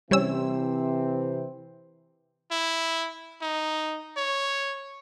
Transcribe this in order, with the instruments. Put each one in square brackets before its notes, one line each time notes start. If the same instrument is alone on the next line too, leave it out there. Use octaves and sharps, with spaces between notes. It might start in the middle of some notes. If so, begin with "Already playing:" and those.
[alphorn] C3 [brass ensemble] E3 C4 [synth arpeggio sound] G3 C#4 E6
[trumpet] E4
D#4
C#5